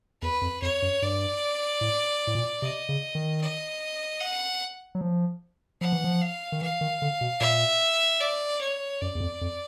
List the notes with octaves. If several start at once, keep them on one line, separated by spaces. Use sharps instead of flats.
E2 B4
F2
F2 C#5
F#2
G2 D5
A2
A2
A#2
C3 D#5
C#3
D#3
D#5
F#5
F#3
F3
F3 F#5
E3
F3
F5
D#3
E3 F5
D#3
D3
B2
A#2 E5
D5
C#5
F#2 D5
E2
F2
F2